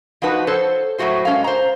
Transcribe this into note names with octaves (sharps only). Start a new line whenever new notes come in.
F3 D4 D#4 F#4 B4 A5
A4 C5 C#5
A2 F#3 A3 F#4 C5
G#3 C#4 A4 F5
C5 A#5